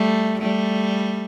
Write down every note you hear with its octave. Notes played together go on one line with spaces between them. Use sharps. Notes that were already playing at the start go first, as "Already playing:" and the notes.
Already playing: G3 A3
G3 A3